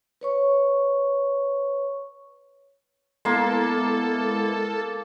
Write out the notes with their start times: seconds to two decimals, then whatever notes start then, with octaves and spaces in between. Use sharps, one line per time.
0.21 B4 C#5 C#6
3.25 G#3 A#3 B3 E4 A4 C6